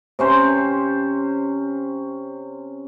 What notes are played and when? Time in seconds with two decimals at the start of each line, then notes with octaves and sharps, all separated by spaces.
0.19 C3 C#4 C5